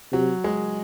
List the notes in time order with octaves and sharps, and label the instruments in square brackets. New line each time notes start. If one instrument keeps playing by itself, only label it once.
[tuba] C3 [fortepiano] F#3
[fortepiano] G#3